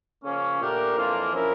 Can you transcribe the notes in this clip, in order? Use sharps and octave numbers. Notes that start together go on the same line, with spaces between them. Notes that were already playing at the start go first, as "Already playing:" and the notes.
C#3 F3 A#3 C#4
A#2 A3 D4 G4 A#4
F2 E3 A#3 D4 F4
F3 C#4 E4 A#4